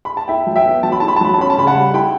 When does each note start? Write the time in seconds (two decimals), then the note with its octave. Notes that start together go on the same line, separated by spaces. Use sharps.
0.05 B5
0.17 A5
0.28 E4 E5 G5
0.47 F#3
0.56 E5 G5
0.65 B3
0.83 F#3 A5
0.92 B5
1.00 E4 A5
1.08 B5
1.16 A5
1.21 F#3 B5
1.34 A5
1.38 C#4 B5
1.50 A5
1.58 C#3 B5
1.67 F#5 A5
1.76 G3
1.94 E4 G5 B5